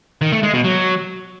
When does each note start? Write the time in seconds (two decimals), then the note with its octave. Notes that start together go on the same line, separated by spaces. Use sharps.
0.22 D#3
0.32 A3
0.43 G#3
0.54 B2
0.64 F#3